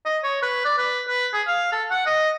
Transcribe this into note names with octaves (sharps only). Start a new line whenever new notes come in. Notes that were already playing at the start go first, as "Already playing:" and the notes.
D#5
C#5
B4
D5
B4
B4
G#4
F5
A4
F#5
D#5